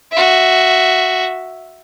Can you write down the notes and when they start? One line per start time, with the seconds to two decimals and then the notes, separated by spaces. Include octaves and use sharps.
0.12 F#4 E5